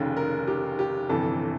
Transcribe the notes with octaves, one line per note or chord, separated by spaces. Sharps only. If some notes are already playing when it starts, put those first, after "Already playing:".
Already playing: F1 D#2 C#3
A#4
G4
G4
G1 F2 C3 E3 A4